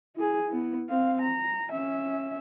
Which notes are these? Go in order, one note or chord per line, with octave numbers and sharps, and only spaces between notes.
E4 G#4
B3 E4
C4 F5
A#5
C#4 E5